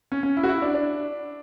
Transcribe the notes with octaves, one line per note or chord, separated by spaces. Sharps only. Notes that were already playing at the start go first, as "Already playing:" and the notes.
C#4
C#4
E4
F#4
E4
D4
D4